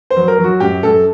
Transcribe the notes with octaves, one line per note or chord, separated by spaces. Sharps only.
C5
F#3
A#4
F#3
F#4
F#2 G4
F#2 A4